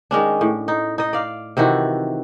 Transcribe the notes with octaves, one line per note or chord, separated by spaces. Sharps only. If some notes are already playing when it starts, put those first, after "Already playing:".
D#3 G#3 C#4 D4
A2
D#4
D#4 D#5
D5 F5
C3 D#3 E3 F#4